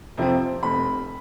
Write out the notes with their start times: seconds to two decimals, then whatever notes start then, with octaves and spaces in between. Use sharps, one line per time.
0.17 F2 C3 F3 C4
0.63 F1 B5